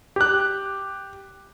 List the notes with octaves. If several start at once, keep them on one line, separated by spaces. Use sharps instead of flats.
G4 F#6